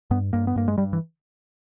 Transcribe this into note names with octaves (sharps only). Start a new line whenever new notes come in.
G2 B3
G2 A#3
B3
G2 A#3
G#3
G2 G3
E3